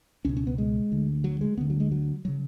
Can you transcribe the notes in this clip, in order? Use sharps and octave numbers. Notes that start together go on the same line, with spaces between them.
C#2 B2 C#4
C#4
B3
G#3
D2 D3
F#3
G#3
D2 D3 B3
F#3
G#3
F#3
C#3 F#3